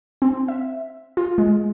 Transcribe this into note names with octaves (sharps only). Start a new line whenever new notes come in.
C4
E5
F4
G#3